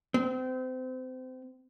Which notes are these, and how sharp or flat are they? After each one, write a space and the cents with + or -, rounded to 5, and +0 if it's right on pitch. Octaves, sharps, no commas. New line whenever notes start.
C4 -30